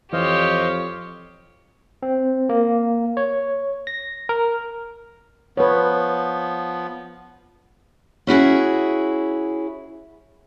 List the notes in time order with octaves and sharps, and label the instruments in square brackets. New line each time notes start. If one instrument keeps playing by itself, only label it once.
[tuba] F2 [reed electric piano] E3 [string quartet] G4 C#5 [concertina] C5 D#5 F5
[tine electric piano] C4
A#3
C#5
A#6
A#4
[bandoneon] F3 B3 [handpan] B4 C#5
[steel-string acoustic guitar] C#4 E4 F#4 G#4